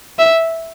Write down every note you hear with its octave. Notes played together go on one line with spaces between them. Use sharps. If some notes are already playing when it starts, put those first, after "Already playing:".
E5